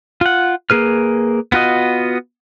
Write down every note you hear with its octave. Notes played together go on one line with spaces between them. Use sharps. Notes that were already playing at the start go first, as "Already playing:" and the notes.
F4 F#5
A#3 G#4 B4 F6
B3 F4 F#4 D#5